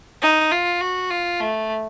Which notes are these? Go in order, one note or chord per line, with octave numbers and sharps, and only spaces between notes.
D#4
F4
F#4
F4
A3